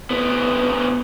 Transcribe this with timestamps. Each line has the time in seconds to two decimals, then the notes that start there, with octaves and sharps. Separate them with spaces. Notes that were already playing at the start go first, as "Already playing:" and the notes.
0.10 D2 B3